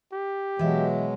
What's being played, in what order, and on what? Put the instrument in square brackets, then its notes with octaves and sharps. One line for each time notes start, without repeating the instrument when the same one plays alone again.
[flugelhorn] G4
[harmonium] B2 F#3 G#3 [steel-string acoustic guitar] E3 E5